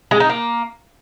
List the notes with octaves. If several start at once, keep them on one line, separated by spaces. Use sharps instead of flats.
G#3
D#4
A#3